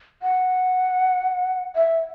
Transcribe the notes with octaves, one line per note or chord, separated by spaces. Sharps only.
F#5
E5